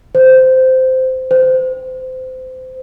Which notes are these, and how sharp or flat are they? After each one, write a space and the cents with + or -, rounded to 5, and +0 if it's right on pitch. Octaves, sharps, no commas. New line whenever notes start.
C5 -10
C5 -25